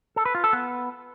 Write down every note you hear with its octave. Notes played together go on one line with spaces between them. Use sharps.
A4
B4
F4
A4
B3